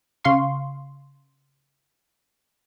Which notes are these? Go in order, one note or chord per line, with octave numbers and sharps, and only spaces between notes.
C#3 F5 C6 C#6